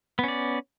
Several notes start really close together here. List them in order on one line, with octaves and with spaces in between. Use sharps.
B3 C#4 D5